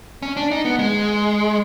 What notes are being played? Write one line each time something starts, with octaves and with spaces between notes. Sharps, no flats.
C#4
D4
D#4
B3
G#3